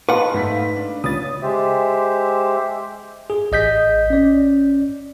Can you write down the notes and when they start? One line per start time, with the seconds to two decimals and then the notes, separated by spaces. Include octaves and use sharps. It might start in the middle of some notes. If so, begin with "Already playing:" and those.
0.09 B4 D#5 F5 F#5 A5 C6
0.34 G#2 A3 B6
0.76 D4
1.04 C#2 D#6 A6
1.43 G#3 G4 C5 E5
3.30 G#4
3.52 A1 D#5 G6 B6
4.10 C#4 D5